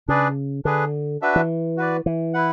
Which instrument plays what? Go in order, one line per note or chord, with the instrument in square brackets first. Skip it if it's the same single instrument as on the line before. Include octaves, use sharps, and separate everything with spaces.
[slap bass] C#3 [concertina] D4 G#4 B4 D5
[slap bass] D3 [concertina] D4 G#4 B4
[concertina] D4 F#4 B4 E5
[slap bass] E3
[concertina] F#4 B4 D5
[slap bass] E3
[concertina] E4 B4 F#5